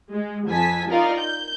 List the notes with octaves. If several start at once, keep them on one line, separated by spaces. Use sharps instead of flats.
G#3
F2 G#5 A5 B6
D#4 F4 A#4 D5 F5
G6